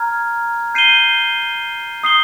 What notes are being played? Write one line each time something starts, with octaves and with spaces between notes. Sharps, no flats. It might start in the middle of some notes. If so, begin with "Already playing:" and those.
Already playing: A#5 F6 G#6
G6 C7 D#7 G7
D#6 G6 C7 G7